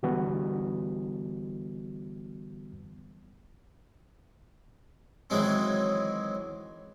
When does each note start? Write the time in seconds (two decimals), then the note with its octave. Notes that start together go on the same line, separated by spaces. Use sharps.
0.03 D3 E3 G3 B3 F#4
5.30 D#3 E3 F#3 G#3 C4